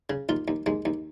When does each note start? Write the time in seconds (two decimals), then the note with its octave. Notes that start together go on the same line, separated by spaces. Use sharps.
0.10 C#3
0.29 D#2 F4
0.48 D#2
0.66 D#2 G#3
0.85 D#2